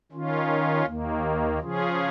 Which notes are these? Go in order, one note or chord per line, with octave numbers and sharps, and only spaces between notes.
D#3 C#4 F4
D#2 D#3 A#3
C#3 F3 C#4 F4 G#4